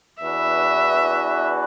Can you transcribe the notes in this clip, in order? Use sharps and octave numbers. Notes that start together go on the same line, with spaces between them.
E2 E3 D4 F#4 B4 E5